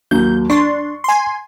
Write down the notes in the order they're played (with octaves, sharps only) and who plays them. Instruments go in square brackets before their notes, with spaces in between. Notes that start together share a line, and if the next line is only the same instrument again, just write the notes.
[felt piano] D#2 F#3 A#3 [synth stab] G6
[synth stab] D4 C6 [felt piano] C#6
[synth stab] G#5 C6